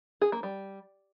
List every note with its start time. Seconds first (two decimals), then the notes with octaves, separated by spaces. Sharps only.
0.21 G#4
0.32 A#3
0.43 G3